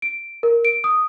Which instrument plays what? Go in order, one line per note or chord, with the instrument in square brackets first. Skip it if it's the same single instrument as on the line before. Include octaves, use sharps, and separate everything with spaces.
[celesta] D7
A#4
D7
D#6